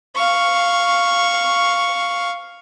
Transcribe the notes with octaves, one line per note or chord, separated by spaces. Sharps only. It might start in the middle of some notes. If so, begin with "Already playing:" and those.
F5 C#6